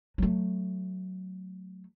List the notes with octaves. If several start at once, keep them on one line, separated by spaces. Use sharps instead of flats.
F#3 A3